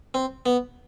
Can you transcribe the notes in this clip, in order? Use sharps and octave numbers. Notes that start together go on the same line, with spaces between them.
C4
B3